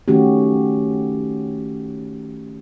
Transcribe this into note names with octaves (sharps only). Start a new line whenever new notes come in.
D#3 A3 C#4 F#4 G4